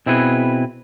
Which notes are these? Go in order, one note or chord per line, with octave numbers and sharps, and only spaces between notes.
B2 C4 E4 G#4 B4